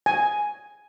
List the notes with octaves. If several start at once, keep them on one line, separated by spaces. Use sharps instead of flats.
G#5